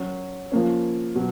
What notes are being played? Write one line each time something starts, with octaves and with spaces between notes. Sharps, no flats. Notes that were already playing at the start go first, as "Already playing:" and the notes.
Already playing: F#3 C#4 F#4 C#5
F3 A#3 C#4
B2 F#3